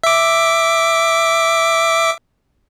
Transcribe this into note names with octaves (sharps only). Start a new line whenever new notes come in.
E5 D6